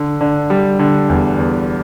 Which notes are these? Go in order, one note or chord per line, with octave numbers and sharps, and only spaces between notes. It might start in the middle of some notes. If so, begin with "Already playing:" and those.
Already playing: D3
D3
G3
D3
E2
E2